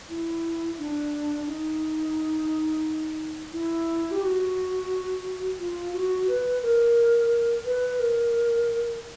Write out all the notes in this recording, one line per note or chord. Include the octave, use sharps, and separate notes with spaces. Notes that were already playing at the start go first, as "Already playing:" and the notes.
E4
D4
D#4
E4
G4
F#4
F4
F#4
B4
A#4
B4
A#4